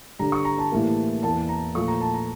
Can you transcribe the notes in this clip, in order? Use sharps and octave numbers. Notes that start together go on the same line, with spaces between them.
G2 D3 G3 A#5
C#6
A#5
A5
A2 E3 G3 A#3
E2 E3 A#3 A5
A#5
A#2 F3 A3 C#6
A#5
A5
A#5